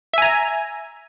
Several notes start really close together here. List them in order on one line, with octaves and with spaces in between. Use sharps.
E5 G#5 A#5